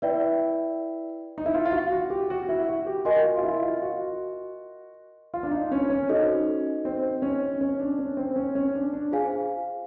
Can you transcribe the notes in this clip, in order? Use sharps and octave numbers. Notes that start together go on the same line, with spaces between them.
E4 B4 D5 G5
D#4
E4
F4
F4
F#4
F#4
G4
F#4
E4
F#4
G4
F#4 A#4 D#5 G#5 C6
F#4
F4
F4
E4
F4
F#4
F4
D4
D#4
C#4
C#4
D#4 F#4 A4 C5 D#5
C4
C#4
C#4
D4
C#4
C4
C#4
C#4
D4
D4
F4 G#4 C5 F5 G#5